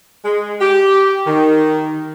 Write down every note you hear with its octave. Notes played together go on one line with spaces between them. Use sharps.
G#3
G4
D#3